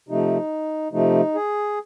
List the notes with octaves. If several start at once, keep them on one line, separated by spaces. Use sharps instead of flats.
C3 F3 A3 D#4
C3 F3 A3 D#4
G#4